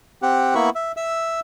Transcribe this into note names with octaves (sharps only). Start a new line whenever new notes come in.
C4 G4 F#5
A#3 B3 E4 B5 C#6
E5
E5 E6